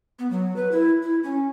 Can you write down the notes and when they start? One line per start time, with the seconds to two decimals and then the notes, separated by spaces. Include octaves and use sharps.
0.19 B3
0.31 F#3
0.56 B4
0.72 E4
1.02 E4
1.23 C#4